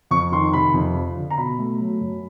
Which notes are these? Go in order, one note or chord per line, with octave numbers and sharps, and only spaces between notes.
F2 C#6
D#3 C6
C3 B5
F2
F3
D3
A#5
B2 B5
A3
F#3
F#2